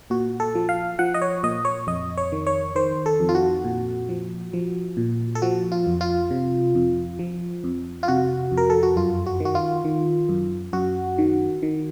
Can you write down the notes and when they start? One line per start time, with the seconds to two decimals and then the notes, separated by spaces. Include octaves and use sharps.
0.10 A#2 F#4
0.40 A4
0.55 F3
0.69 F5
0.99 F3 F#5
1.14 D#5
1.22 C#5
1.43 A#2 D#5
1.65 C#5
1.87 F2 D#5
2.17 C#5
2.32 D#3
2.47 C#5
2.75 D#3 C5
3.06 A4
3.20 F2
3.29 F4
3.35 F#4
3.64 A#2
4.09 F3
4.53 F3
4.97 A#2
5.35 A4
5.42 F3 F#4
5.72 F4
5.87 F2
6.01 F4
6.31 C3
6.75 F2
7.19 F3
7.64 F2
8.03 F4
8.08 C3 F#4
8.51 F2
8.57 A#4
8.70 A4
8.83 F#4
8.96 F#2 F4
9.26 F#4
9.40 D#3
9.45 F#4
9.55 F4
9.84 D#3
10.29 F#2
10.73 F#2 F#4
11.18 D#3
11.63 D#3